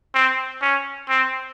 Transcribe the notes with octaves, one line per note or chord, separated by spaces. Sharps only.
C4
C#4
C4